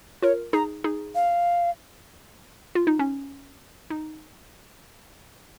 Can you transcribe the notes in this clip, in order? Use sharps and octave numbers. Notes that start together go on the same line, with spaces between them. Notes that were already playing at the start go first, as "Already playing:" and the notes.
F4 A#4 C#5
D#4 G#4 A#5
D#4 G#4
F5
F4
D#4
C#4
D#4